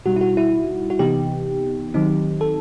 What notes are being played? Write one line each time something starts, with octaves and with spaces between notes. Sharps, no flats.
B2 G3 D#4 F#4
E4
F#4
E4
F#4
C3 E3 B3 D#4 G4
D#3 F#3 C4 D#4
A4